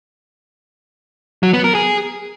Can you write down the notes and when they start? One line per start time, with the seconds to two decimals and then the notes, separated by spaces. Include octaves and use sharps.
1.43 F#3
1.53 B3
1.64 A#4
1.75 G#4